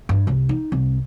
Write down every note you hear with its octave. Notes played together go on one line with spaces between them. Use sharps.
G2
C2
D#4
C2